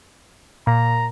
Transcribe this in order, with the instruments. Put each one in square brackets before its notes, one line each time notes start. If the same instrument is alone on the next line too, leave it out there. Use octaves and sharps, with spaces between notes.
[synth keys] A#2 [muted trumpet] A#5